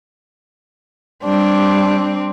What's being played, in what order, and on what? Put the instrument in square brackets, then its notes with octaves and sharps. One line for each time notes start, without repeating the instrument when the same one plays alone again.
[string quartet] G3 C4 D4